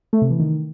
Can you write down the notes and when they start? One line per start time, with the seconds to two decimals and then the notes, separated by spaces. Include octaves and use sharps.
0.13 A3
0.22 C3
0.31 E3
0.40 D#3